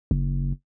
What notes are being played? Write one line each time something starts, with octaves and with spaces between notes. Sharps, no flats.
F#1